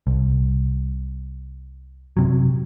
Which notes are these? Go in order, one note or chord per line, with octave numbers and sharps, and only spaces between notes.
C2
F#2 C3 F#3